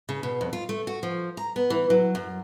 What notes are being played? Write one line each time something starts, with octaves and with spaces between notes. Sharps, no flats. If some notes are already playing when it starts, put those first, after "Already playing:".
C#3
B2
F2
F4
A3
F#4
F3
A#5
B3
E3
F#3
F#2